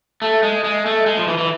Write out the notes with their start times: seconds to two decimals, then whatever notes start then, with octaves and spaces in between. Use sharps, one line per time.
0.22 A3
0.43 G#3
0.64 G#3
0.86 A3
1.06 G#3
1.17 F3
1.28 E3
1.38 E3